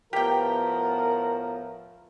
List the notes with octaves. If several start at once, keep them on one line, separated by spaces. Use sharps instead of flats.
A2 F3 B3 G4 A#4 G5